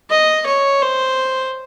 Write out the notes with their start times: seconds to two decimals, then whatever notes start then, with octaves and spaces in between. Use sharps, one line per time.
0.10 D#5
0.47 C#5
0.82 C5